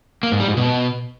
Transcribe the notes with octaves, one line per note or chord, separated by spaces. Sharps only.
A#3
G#2
G3
G#2
B2